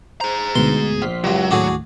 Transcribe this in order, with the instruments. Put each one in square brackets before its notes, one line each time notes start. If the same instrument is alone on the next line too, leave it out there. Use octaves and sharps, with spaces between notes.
[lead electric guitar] G#4 A#5 [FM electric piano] C5
[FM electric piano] D2 G#2 B2 [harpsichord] C6
[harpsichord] A#1 [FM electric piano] C6 F6 B6
[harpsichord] C#2 F#2 [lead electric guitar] F#3 [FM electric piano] G3 F4
[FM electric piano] D#2 A2 [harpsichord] D4 F#4 G#4